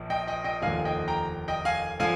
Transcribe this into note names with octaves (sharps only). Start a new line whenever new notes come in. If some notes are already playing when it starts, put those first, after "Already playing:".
Already playing: A#1 A#2 F3
D#5 G5
D#5 G5
D#5 G5
F1 D#2 D3 F3 F5 G#5
D#5 G5
G5 A#5
D#5 G5
F5 G#5
D3 F3 F5 G#5